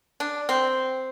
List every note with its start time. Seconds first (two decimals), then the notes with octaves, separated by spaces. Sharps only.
0.20 D4
0.49 C4